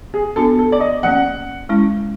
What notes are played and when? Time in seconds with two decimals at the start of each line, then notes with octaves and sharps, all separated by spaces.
0.14 G#4
0.36 B3 D4 F#4 A4
0.59 A4
0.72 D5
0.80 D#5
1.03 F3 A#3 C#4 F#5
1.69 G#3 C#4 E4